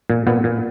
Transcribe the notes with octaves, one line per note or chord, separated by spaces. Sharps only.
A#2
A#2 B3
A#2